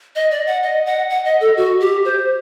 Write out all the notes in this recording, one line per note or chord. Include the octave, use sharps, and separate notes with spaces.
D#5
D5
F#5
D#5
F#5
F#5
D#5
A4
F#4
G4
C5